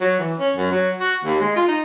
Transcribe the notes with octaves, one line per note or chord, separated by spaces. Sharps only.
F#3
E3
C#4
F#2
F#3
F#4
D#2
G#3
F4
D#4